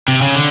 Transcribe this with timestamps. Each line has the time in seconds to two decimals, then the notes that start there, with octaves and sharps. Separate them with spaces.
0.08 C3
0.22 C#3
0.35 D3